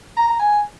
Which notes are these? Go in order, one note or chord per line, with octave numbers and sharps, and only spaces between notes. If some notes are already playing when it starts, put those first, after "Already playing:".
A#5
A#5
G#5